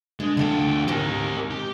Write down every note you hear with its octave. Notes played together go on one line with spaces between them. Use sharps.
D3 G#3
D2 D3 F4 A4 G5
G#2 C3 D#3 G4 A#4
G4